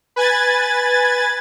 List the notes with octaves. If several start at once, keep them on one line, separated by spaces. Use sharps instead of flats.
B4 G#5 G#6 A6